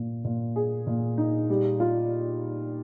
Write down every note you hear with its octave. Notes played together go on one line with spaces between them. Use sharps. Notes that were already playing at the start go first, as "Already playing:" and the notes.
Already playing: A#2
A#2
G#4
A#2
D#4
G3
F4